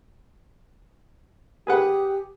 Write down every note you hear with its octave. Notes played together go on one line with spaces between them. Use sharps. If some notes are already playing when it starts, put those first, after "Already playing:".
G4 G#4 B4 F#5